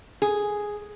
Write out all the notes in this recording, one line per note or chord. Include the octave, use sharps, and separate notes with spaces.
G#4